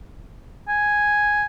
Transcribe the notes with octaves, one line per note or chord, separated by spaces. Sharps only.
G#5